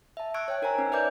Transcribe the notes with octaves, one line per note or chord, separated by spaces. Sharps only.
E5 A5
C#6 E6 F#6 G#6 D7
C#5 G5 F#6
D#4 A#4 C5 G#5 A#5
C#4 D#4
B4 C#5 D5 E5 D6 G6